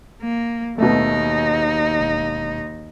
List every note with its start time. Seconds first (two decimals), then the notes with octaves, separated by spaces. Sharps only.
0.21 A#3
0.78 D#2 B2 A3 D#4
2.00 E1